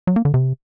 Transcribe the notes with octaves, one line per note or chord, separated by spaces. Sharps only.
F#3
A#3
D3
C3